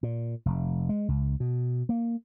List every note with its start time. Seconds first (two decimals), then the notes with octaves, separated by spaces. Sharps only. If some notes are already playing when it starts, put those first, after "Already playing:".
0.03 A#2
0.46 F1
0.89 G#3
1.08 C#2
1.40 B2
1.89 A#3